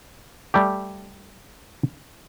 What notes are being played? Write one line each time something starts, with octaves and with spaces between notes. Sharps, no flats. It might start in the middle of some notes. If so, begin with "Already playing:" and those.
G3 A3 G4